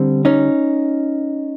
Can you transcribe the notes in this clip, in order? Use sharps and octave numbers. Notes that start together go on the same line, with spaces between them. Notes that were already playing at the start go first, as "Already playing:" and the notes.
Already playing: D3 G3 C4
C#4 D#4